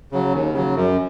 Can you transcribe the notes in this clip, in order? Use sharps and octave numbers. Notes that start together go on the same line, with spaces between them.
C#3 F#3
D#2
C#3 F#3
F#2